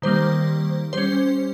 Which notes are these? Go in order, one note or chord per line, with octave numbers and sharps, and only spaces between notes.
D#3 G3 A#3 C5
G3 C#4 C5